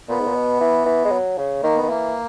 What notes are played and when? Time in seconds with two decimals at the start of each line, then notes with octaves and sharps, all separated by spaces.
0.09 A#2 B3
0.20 G#2
0.27 A#2
0.35 B2
0.60 E3
0.86 E3
1.05 G#3
1.12 F#3
1.38 C#3
1.63 D#3 A#3
1.76 B3
1.83 D#3
1.89 E3 A#3